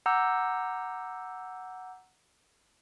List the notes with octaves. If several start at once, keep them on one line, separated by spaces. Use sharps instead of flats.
F#5 A#5 D6 E6 G6